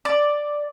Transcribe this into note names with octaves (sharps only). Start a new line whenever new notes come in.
D5